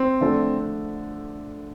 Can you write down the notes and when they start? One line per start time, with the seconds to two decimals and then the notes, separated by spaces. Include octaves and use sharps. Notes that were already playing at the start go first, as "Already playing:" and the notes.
Already playing: C4
0.21 D3 F3 A3 D4 A4